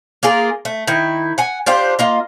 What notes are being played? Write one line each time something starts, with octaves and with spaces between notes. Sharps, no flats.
A#3 F4 G#4 A#4
A3
D#3 E4
F#5 G#5
D4 F4 G4 C5
A#3 F4 D#5